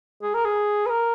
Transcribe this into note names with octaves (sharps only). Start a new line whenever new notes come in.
G#4
A#4
G#4
B4
A#4